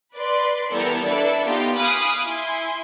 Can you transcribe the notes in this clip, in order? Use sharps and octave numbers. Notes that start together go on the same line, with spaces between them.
B4 D5 C6
E3 G3 B3 A4 A#4
D4 E4 A4 B4 D5
B3 D#4 F4 G4
F5 G#5 B5 D6 D#6 F#6
E4 G#5 C6